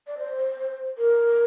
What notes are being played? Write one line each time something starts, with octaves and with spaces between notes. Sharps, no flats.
D5
C5
A#4